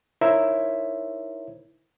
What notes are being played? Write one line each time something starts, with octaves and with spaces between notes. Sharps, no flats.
D#4 E4 A#4 C5 C#5 E5